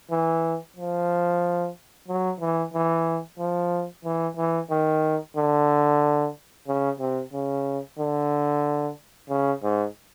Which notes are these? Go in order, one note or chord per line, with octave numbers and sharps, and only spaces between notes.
E3
F3
F#3
E3
E3
F3
E3
E3
D#3
D3
C#3
C3
C#3
D3
C#3
G#2